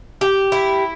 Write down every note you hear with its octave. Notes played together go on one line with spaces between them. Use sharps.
G4
E4